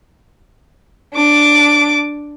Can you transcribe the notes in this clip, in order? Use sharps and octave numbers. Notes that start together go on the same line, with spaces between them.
D4 D6